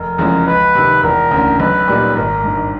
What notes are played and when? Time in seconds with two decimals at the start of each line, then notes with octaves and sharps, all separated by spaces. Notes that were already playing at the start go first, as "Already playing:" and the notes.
Already playing: F1 A#4
0.18 E2 C#3 F3 G#3
0.46 C#2 B4
0.75 C3 D#3
1.03 E1 A#4
1.31 D2 C#3
1.60 B1 B4
1.88 A#2 G3 A#3 D#4
2.16 G#1 A#4
2.44 G2 D#3